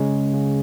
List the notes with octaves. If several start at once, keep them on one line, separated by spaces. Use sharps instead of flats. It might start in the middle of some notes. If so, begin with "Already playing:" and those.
Already playing: C#3 G#3 C#4
C#3